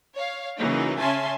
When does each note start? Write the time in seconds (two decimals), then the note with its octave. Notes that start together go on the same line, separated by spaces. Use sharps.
0.15 C#5 F5
0.57 C#3 E3 F#3 A#3 D#4
0.99 C#3 C#4 E5 G#5 A5 C6